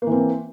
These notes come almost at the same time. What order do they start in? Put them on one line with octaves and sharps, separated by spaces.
A#3 E3 C4